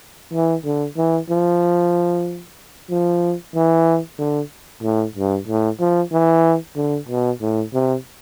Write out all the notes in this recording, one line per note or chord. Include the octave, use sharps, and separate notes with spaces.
E3
D3
E3
F3
F3
E3
D3
A2
G2
A2
F3
E3
D3
B2
A2
C3